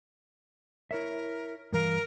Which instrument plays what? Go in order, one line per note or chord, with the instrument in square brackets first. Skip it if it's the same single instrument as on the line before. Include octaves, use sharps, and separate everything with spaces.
[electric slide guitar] E4 C#5 E5 [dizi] A#4
[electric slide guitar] G2 E3 F5 [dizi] A#4